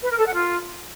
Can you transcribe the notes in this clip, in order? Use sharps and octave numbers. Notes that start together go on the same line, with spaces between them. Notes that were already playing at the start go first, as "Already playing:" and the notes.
B4
A#4
A4
F#5
F4